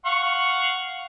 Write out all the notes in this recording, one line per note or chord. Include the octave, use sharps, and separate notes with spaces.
F5 F#5 C#6